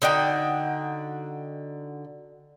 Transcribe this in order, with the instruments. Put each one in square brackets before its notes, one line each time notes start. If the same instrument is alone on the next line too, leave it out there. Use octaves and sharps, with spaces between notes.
[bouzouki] D3 D#4 F#4 G5